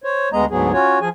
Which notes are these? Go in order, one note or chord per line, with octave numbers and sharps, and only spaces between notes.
C5 C#5
D2 G#3 B3 D#5 A#5
D2 G#2 F#3 B3 G#4
C#4 F4 F#4 C#5
F3 G#4 G#5